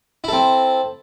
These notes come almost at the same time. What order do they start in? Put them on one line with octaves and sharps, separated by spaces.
E4 A4 C4